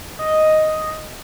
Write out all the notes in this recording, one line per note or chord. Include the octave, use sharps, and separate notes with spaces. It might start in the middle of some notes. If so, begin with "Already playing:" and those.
D#5